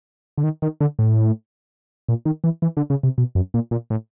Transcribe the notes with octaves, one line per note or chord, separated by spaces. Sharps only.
D3
D#3
D#3
D3
A2
A#2
D#3
E3
E3
D3
C#3
C3
B2
F#2
A#2
A#2
A2